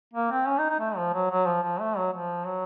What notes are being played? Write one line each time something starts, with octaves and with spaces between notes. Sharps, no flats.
A#3
C4
C#4
D#4
D#4
A3
F3
F#3
F#3
F3
F3
A3
F#3
F3
F#3